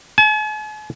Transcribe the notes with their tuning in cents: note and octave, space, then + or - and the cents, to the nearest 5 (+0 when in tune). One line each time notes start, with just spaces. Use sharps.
G#5 +45